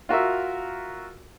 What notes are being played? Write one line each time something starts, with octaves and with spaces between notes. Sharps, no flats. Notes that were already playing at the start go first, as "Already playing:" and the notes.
F4 F#4 A#4 E5